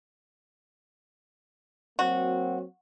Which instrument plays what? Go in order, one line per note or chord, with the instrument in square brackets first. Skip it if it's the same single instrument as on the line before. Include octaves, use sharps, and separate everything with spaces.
[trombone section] F#3 A#3 C4 [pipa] F#4